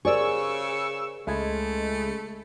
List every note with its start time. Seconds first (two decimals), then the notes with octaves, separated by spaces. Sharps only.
0.05 C#3 G4 G#4 A#4 C5 D5 C#6 E6
1.27 C#2 G#3 A3 E5 B5 G#6